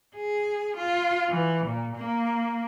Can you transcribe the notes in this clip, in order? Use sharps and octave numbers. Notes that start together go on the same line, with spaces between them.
G#4
F4
E3
A#2
A#3